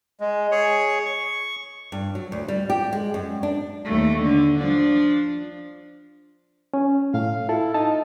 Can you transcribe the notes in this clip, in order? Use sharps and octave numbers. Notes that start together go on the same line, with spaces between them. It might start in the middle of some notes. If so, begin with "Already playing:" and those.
G#3
G#4 C#5
C#6
G2
F#3
D2
G3
G4
G#3
F#2
D4
D#2 A3
D3
F3 D4
C#4
A2 F5
E4 F4 A4
D#4 A5